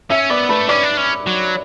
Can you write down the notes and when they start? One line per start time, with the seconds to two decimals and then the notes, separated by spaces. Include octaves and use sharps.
0.10 C#4 E5 E6
0.30 B3 D5 D6
0.49 A3 B4 B5
0.68 C#4 D5 D6
0.83 D4
0.97 C#4
1.27 F#3